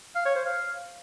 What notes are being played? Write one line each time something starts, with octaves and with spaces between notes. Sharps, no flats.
F5
C#5
C5
F5